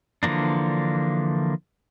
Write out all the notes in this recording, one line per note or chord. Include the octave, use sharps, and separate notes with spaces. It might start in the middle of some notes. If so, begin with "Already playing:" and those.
D3 E3 F3 A#3 D4